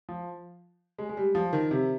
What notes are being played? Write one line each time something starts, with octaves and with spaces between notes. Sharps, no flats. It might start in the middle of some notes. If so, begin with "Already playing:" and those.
F3
G#3
G#3
G3
F3
D#3
C3